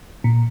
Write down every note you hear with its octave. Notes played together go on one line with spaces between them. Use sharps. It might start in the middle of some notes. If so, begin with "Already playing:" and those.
A#2